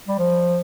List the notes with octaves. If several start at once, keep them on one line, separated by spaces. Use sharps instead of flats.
G3
F3